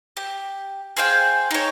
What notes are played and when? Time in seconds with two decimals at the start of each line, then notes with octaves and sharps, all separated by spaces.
0.17 G4
0.97 G#4 C5 F5 G5
1.51 D#4 C#5